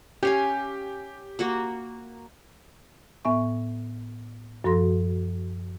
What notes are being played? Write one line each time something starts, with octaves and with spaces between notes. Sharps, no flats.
C#4 G4 F5 G#5
A#3 F#4 F#5
A2 B3 E5 G#5 C#6
F#2 F3 F#4 A4 C6 A#6